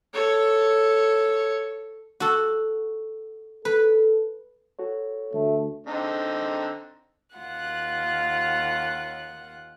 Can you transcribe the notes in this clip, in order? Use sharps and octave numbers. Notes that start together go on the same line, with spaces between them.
A4 C#5
F#4 A4
A4 B4
F#4 A4 C#5
D2 A3
D3 C4 D#4
D#2 F4 F#5 F#6